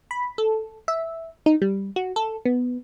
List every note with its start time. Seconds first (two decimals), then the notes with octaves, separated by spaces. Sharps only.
0.11 B5
0.38 A4
0.88 E5
1.46 D#4
1.62 G3
1.96 F#4
2.16 A4
2.45 B3